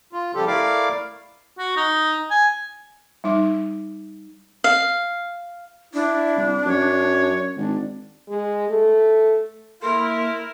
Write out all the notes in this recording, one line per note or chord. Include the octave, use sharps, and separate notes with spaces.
F4
C#3 F3 G3 G4 A4
A3 E4 A#4 D5 F5 D6
F#4
D#4
G#5
G3 D#4 D6
F5
D4 E4
C2
F#2 C#5
G#1 D4
G#3
A3
A#3 E4 A#4 C6